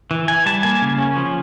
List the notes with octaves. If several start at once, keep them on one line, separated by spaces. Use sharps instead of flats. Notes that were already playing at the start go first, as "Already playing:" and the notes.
E3
E3 G#5
G3 A5
A#3 G#5
C#3
C#4
F3